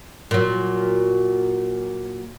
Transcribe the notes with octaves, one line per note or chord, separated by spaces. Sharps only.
A#2 F#3